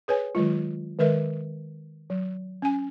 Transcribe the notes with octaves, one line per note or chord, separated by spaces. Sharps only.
G#4 B4 C#5 G#5
D#3 F#3 G#3 F4
D#3 G#3 A#4 B4 E5
F#3
C#4 G#5